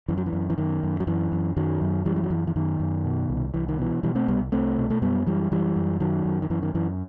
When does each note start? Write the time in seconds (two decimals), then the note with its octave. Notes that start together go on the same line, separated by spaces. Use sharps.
0.08 F#2 E3
0.18 F#3
0.26 E3
0.33 F#2
0.50 E3
0.58 F#2 D#3
0.83 F#2
1.00 F#3
1.07 F#2 E3
1.32 F#2
1.57 F#2 D#3 F#3
1.81 F#2
2.05 F#2 E3 G3
2.16 G3
2.24 F#3
2.30 F#2 E3
2.47 E3
2.56 F#2 D#3
2.80 F#2
3.05 B2
3.30 C2
3.54 C2 E3
3.68 D#3
3.78 B2 E3
4.03 B2 E3 G3
4.15 A3 C4
4.28 C2 G3 B3
4.52 C2 A3 C4
4.78 B2
4.90 A3
5.02 F#2 G3 B3
5.27 F#2 E3 G3
5.51 F#2 E3 G3
5.76 F#2
6.00 F#2 D#3 F#3
6.25 F#2
6.42 D#3
6.50 F#2 E3
6.63 D#3
6.74 F#2 E3